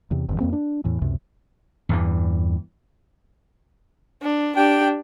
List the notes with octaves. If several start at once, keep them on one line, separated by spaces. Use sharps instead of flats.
E2 C3
G1 F2 D#3
F2 G#2 A#3 C4
D4
E2 A2 E3
C#2 F#2 C3
E2 G2 E3
D4
D4 G4 G5